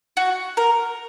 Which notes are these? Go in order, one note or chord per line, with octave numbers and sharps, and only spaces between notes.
F#4
A#4